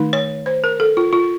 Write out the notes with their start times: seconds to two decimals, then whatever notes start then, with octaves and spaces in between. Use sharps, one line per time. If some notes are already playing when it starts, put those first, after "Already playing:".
Already playing: D#3 A3 D#4
0.13 C#5
0.46 C5
0.64 A#4
0.80 A4
0.97 F4
1.13 F4